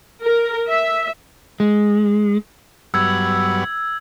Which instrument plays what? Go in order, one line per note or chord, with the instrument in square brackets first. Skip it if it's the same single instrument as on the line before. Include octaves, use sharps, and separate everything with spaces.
[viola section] A#4
E5
[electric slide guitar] G#3
[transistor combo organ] G2 F#3 B3 [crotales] E6 G#6